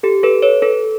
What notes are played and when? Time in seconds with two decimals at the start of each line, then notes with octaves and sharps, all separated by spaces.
0.03 G4 A4
0.23 A4 B4
0.42 B4 C#5
0.62 A4 B4